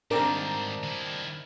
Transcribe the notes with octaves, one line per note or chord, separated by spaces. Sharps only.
G#2 D#3 G3 C4 D4 A#4
D#3 E4